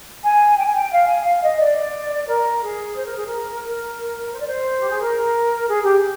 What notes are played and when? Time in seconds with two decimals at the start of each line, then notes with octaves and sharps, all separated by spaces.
0.23 G#5
0.58 G5
0.65 G#5
0.73 G5
0.91 F5
1.07 G#5
1.25 F5
1.42 D#5
1.60 D5
2.28 A#4
2.62 G#4
2.96 C5
3.05 A#4
3.16 G#4
3.25 A#4
3.64 A#4
4.33 C5
4.40 D5
4.46 C5
4.78 G4
4.90 G#4
5.00 A#4
5.68 G#4
5.82 G4